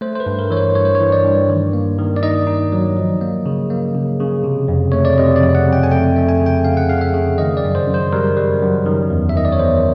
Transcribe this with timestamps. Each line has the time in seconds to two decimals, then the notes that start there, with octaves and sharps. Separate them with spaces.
0.01 A3 C5
0.15 C5
0.20 B4
0.26 G2
0.39 A#4
0.50 E3 C#5
0.57 C5
0.75 G2 C#5
0.85 C5
0.95 C#5
1.00 E3
1.12 D5
1.24 G2
1.50 D#3
1.73 A#3
1.99 D#3
2.16 D5
2.23 D#4 D#5
2.47 D#4
2.72 F#3
2.97 F3
3.21 A#3
3.46 C#3
3.70 A#3
3.95 C#3
4.20 C#3
4.44 C3
4.68 F2
4.92 A3 C#5
5.05 D5
5.17 C3 D#5
5.36 D5
5.42 F2
5.55 F#5
5.67 F2
5.73 G5
5.83 G#5
5.91 A3 G5
6.16 A3
6.29 G#5
6.40 C#3
6.46 G5
6.64 C#3 F5
6.77 F#5
6.89 C#3 F5
7.01 E5
7.14 C#3
7.38 D#3 D#5
7.57 D5
7.64 F#2
7.75 C5
7.88 F#2
7.94 C5
8.13 G3 A#4
8.37 G3
8.61 F#2
8.86 D#3
9.10 E2
9.29 E5
9.36 D#3 D#5
9.45 D5
9.52 C#5
9.59 E2 C5